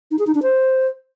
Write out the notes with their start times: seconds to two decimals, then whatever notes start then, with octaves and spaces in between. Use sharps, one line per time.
0.11 D#4
0.19 G#4
0.27 D#4
0.35 D4
0.43 C5